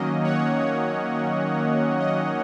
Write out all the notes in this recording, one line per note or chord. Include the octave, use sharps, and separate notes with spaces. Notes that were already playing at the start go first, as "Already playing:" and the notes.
Already playing: D#3 F#3 A#3 C#4 D#5
C#5 F#5
C#5
D#5